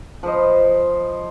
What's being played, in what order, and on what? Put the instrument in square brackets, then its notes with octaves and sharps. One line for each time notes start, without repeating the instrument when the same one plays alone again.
[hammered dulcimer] F3 B4 C5 D#5